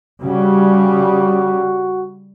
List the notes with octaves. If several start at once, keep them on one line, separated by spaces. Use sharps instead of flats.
C#3 G3 F#4